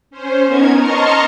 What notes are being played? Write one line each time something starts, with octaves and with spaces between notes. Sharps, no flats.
C#4 C5
B3 C#4 D#4 A#4 G#6
D#5 A5 A#5 C6 C#6 F6